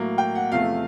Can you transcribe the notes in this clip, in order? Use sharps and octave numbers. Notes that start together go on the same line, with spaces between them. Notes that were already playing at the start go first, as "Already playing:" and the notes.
Already playing: A2 F#3 A#3
G5
F#5
E2 C3 F3 A3 F5